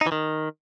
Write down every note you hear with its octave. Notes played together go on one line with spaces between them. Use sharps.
D#4
E3
D#3